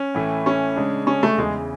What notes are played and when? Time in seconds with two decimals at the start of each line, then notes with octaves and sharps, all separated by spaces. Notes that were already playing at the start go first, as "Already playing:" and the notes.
Already playing: C#4
0.15 A2 E3 A3
0.46 C#4
0.76 C#3 G#3 D4
1.07 C#4
1.23 A3
1.38 E2 C#3 E3 G#3